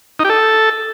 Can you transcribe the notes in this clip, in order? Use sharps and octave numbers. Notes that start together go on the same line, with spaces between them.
D#4
G4
A4